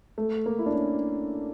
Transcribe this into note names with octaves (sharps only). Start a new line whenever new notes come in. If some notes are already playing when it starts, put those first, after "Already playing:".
A3
A#3
E4
D4
C#4